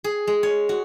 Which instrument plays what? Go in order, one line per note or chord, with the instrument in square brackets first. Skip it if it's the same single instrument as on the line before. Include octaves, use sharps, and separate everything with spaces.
[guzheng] G#4
G#3
C#5
F#4